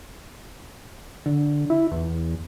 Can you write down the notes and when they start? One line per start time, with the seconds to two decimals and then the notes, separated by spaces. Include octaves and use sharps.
1.26 D3
1.70 E4
1.91 E2